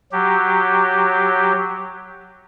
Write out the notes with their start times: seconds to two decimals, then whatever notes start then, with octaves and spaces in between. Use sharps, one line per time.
0.12 F#3 G4